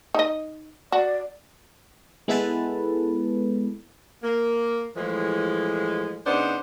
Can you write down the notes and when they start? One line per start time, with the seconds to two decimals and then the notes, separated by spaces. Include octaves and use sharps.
0.15 D#4 D#5
0.92 F#4 D5
2.28 G#3 B3 E4 A4 B4 A5
4.23 A#3
4.95 A2 E3 F3 G#3
6.25 C#3 B3 D4 D#4 C5